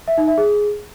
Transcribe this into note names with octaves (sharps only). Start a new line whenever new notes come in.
E5
D#4
E5
G#4